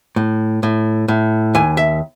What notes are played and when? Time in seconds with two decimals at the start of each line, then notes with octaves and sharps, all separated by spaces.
0.16 A2
0.63 A2
1.08 A2
1.55 D#2 G#5
1.77 E5